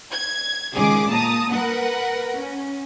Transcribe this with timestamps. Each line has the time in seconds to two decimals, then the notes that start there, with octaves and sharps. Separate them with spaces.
0.12 G#6
0.75 C#2 D#3 G#4 D6
1.09 A#2 A5 A#5 D#6
1.53 A#4 B4 F#5
2.37 C#4